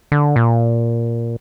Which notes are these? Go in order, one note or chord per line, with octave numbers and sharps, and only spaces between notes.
D3
A#2